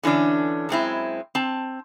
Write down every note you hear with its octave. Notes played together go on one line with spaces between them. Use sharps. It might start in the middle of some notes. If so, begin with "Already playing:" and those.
D3 E3 C#4 D4
F#2 G#3 C4 E4
C4 A5